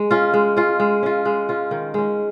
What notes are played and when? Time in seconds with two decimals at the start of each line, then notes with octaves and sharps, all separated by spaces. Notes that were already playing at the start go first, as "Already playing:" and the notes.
Already playing: G#3
0.11 C#4 F4
0.34 G#3
0.57 C#4 F4
0.80 G#3
1.03 C#4 F4
1.25 G#3
1.49 C#4 F4
1.71 D#3
1.94 G#3 C#4